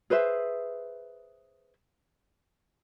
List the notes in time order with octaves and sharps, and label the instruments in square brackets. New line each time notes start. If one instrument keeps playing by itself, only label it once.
[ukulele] G#4 B4 C5 E5